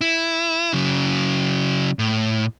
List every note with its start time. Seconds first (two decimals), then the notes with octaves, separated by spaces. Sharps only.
0.01 E4
0.73 C#3 F#3
1.99 A2